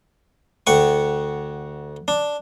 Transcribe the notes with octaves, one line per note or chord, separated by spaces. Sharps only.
D2 F#5 G5 C#6
D4